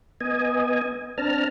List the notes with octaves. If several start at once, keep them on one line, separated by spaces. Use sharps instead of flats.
B3 D#5 G#5
C4 D4 A5 A#5 F6